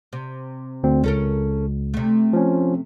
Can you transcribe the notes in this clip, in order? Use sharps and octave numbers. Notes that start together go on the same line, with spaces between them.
C3
D2 C4
C#2 C#4 A4 A#4
C3 A3
F3 C#4